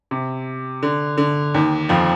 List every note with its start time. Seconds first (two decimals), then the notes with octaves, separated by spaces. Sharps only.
0.11 C3
0.83 D3
1.18 D3
1.54 D#2 D#3
1.89 F2 F3